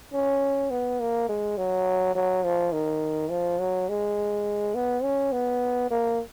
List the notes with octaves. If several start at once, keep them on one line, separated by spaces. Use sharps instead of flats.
C#4
B3
A#3
G#3
F#3
F#3
F3
D#3
F3
F#3
G#3
B3
C#4
B3
A#3